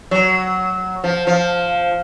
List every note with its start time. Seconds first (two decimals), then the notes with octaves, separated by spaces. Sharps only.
0.11 F#3
1.04 F3
1.27 F3